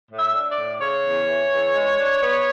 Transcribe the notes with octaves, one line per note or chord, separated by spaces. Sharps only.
A2
E5
D4
D5
A2
C#3 C#5
E2
E3
E2
G#3
D4
B3